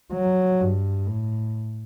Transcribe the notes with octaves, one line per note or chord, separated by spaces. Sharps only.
F#3
G2
A2